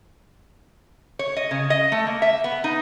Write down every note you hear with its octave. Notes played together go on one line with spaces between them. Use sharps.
C#5
D#5
C#3
D#5
A3
A#3
E5
B3
D#4